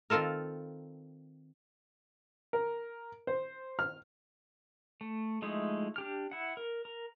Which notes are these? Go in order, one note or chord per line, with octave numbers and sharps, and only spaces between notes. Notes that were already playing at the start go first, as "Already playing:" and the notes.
D#3 C4 F4 A4 A#4
A#4
C5
F6
A3
F3 G#3 A3 D#4 E4
D4 G4 F6
E4 F#5
A#4
A#4